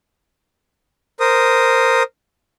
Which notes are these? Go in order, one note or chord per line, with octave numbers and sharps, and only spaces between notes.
A#4 C5 D#6